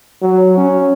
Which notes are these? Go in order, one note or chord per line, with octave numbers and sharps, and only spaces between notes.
F#3
C#4